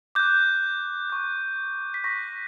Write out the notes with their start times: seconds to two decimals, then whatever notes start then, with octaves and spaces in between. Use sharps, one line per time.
0.15 D6 F#6 G6
1.10 C#6 F#6
1.94 B6
2.04 C#6 F#6 A#6